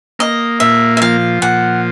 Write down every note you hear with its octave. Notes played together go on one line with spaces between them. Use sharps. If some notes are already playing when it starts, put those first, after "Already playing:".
A#3 D#5
A#2 E5
E5
F3 F5
A#2 F#5